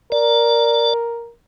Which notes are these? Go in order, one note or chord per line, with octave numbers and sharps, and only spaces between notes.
A#4 D5